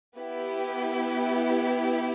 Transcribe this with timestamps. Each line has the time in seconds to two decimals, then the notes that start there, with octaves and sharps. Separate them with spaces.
0.16 B3 E4 G4 B4